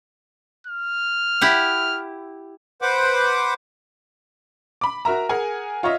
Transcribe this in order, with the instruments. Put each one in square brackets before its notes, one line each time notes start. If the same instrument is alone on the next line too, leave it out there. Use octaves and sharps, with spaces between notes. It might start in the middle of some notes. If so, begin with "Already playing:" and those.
[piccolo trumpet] F6
[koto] E4 G4 F#5
[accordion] B4 C5 F#5 D6
[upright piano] B5 D6
F#4 A#4 E5 A#5
G#4 A#4 F#5 G#5
F4 C#5 D#5 E5